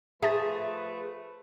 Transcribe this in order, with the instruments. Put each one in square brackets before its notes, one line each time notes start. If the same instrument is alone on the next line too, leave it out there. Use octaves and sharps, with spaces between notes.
[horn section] F3 A3 B4 [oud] G#4 [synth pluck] E5 A5 A6